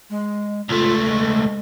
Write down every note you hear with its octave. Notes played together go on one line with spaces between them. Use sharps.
G#3
C#2 A3 F4
G#3